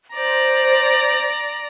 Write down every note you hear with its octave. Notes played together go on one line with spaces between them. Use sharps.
C5 D5 A#5